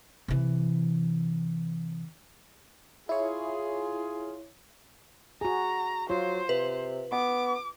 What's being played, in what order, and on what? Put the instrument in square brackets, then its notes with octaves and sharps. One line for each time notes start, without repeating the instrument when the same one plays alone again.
[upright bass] C3 E3
[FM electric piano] E4 C#5 [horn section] F4 G#4
[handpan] F#4 G#4 [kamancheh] A#5
[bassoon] F#3 [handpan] F4 [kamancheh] C5
[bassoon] C3 [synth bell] B4
[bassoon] B3 [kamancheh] D6